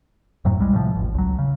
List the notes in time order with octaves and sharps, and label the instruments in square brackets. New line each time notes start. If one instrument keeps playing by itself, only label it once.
[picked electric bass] F2 A2 F#3
C2 G3 G#3
A2 C3 F3
E1 A1
C#2 F#3
C#3